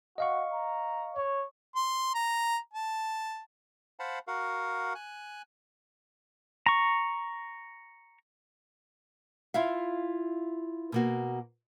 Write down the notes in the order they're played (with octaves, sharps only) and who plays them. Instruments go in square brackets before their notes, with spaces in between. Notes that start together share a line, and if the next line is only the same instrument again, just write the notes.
[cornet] F#4 [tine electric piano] D#5 F5 C#6
[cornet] A#5
C#5
[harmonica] C6
A#5
A5
[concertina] C5 F5 F#5 A5 B5
F#4 A#4 F5 F#5
G#5 F#6
[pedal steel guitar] A#5 C#6
[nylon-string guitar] E4 F4 E5 F5
B2 A#3 F#4